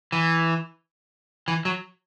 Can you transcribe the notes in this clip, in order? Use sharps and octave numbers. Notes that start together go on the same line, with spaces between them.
E3
E3
F#3